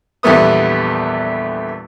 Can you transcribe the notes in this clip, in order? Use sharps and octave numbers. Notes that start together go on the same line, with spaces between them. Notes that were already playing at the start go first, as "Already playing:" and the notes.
A#1 E2 G3 A3 B3 D#6